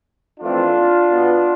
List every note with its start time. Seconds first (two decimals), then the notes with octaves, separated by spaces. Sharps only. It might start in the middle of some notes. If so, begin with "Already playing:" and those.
0.40 F2 E3 A3 C4 D4 F4
1.10 B2 B3